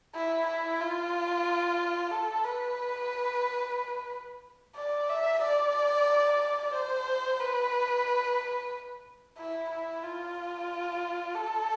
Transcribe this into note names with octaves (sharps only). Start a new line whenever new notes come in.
E4
E4
F4
A4
B4
D5
E5
D5
C5
B4
E4
E4
F4
A4